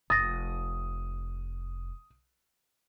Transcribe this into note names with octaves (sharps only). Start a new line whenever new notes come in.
F1 D#6 A6 A#6